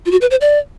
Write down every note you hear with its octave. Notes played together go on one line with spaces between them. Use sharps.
F4
F#4
B4
C5
D5